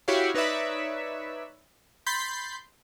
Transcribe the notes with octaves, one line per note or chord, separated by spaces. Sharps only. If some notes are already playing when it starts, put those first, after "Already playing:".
E4 F#4 G4 C#5 F5
D#4 B4 C#5 D5 E5
B5 C6 G6 A6 B6